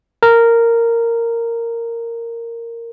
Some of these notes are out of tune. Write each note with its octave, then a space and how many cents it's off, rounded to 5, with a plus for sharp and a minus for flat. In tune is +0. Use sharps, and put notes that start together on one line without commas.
A#4 -10